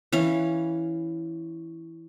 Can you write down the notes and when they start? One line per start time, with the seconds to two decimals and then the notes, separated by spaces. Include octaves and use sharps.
0.12 E3 C#4 F5